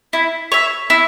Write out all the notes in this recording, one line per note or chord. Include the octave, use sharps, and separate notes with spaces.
E4
C#5 E5
E4